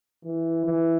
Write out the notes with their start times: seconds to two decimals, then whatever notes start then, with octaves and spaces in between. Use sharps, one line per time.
0.25 E3
0.65 E3